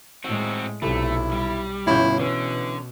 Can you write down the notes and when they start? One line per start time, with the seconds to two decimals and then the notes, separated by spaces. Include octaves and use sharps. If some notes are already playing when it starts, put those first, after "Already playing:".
0.24 A2 G#3 C4 F#4
0.82 B1 C3 A3 E4 A4
1.32 G3
1.87 G1 B2 C#4 E4 G6
2.20 D3 E3 C#4